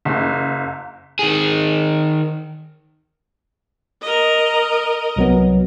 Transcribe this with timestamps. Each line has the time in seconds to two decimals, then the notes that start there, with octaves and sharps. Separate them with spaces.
0.05 F#1
1.19 D#3 G#4
4.02 A#4 D#5
5.16 C2 F#3 B3